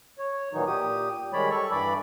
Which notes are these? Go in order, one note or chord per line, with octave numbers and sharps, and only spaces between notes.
C#5
A#2 D#3 E3 F#3 D#4
A#2 G4 D#6
D#3 G3 G#3 C#5 D5 B5
G3 A4 C#6
G2 E3 D5 B5 D6